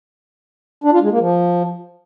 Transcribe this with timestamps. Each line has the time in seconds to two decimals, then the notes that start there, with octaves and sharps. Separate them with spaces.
0.84 D4
0.93 F4
1.02 G#3
1.11 A#3
1.20 F3